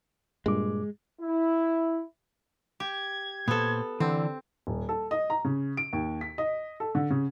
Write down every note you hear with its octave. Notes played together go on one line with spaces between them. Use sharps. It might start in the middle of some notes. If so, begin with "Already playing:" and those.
G2 A#2 G#3 D6
E4
G4 G#6
A#2 B3 A4 C5
D3 E3 C4
D#1
A4
D#5
A#5
C#3
D7
D#2
B6
D#5
A4
D3
C#3